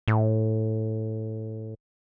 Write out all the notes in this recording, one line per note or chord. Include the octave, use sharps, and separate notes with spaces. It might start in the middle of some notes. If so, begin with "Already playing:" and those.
A2